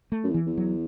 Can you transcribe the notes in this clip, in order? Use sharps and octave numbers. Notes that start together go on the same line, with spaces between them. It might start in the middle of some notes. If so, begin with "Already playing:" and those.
A3
F#2
E2
E3
E2
F#3